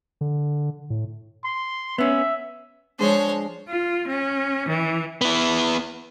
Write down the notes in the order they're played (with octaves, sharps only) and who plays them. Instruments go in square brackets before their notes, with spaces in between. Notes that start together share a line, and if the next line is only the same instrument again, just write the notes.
[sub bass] D3
A2
[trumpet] C6
[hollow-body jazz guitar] B3 C#4 [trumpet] E5
[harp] F3 G#3 D4 [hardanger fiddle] C5 C#5
[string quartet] F4
C#4
E3
[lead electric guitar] B3 E4